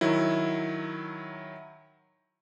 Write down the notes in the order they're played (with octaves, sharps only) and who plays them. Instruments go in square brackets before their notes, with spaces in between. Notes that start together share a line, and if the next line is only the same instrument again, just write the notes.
[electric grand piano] D#3 F#3 E4